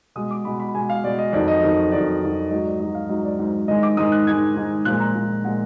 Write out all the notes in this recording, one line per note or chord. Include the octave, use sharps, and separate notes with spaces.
B2 G#3 D#6
D6
B2 G#3 B5
B5
B2 G#3 G#5
F5
B2 G#3 D5
D#5
F2 D#3 F#3 D5
D#5
F2 D#3 F#3
F2 D#3 F#3 D5
F2 D#3 F#3
G#2 F#3 D#5
D5
G#2 F#3 D#5
F5
G#2 F#3 D#5
D5
G#2 F#3
G#2 D#3 G#3 D#5
D6
G#2 D#3 G#3 D#6
F#6
G#2 D#3 G#3 G#6
G#2 D#3 G#3
A#2 F3 G#3 F#6
A#5
A#2 F3 G#3
A#2 F3 G#3 F#5